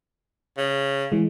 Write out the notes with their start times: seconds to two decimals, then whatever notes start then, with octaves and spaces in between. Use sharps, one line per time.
0.58 C#3
1.12 E3 G#3